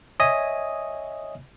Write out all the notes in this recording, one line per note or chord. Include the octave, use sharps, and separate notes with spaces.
C#5 D#5 E5 G#5 D#6